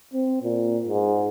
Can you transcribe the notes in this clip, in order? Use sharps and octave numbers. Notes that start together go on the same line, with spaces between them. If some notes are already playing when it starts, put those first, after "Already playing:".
C4
A#2
G#2